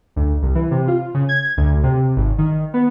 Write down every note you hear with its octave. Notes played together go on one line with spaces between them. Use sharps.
D2
C2
E3
C3
F4
C#3
G#6
D2
C3
G#1
D#3
B3